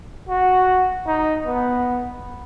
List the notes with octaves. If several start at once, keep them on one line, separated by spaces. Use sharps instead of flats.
F#4
D#4
B3